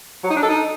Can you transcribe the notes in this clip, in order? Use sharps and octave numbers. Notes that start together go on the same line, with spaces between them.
F#3
D#4
D4
A4
D#4